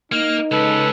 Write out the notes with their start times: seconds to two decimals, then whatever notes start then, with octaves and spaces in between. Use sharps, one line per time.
0.12 A#3 D#4 F6
0.51 C#2 A4 B4